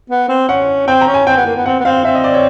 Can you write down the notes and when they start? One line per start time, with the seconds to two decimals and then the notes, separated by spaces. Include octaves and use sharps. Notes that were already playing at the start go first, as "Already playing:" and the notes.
0.10 B3
0.29 C4
0.49 C#4 F#5
0.87 C4 G5
1.01 A#5
1.07 C#4
1.14 G#5
1.27 C4 G5
1.36 B3
1.46 A#3
1.56 B3
1.66 C4 F#5
1.80 B3
1.85 C4 F5
2.05 C4 E5
2.15 D#5
2.24 D5
2.34 C#5